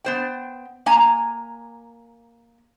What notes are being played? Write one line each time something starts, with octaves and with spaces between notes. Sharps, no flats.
B3 C5 G5
A#3 G#5 A#5